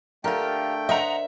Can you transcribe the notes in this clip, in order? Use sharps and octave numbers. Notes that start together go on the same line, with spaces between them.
D3 A3 F4 G4 A#4 F5 G5
C5 D#5 E5 F#5 A#5